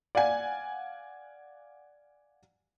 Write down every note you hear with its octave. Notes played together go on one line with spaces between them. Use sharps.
D5 F5 F#5 G#5